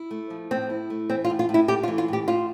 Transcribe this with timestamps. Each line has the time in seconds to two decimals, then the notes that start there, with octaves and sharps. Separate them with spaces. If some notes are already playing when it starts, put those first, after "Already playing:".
Already playing: E4
0.11 A3
0.30 F3
0.51 A2 C4
0.70 E4
0.90 A3
1.10 E3 C4
1.25 F4
1.30 A2
1.39 F4
1.49 A2
1.54 E4
1.68 A3 G4
1.83 F4
1.88 E3
1.98 F4
2.08 A2 G4
2.28 A2 F4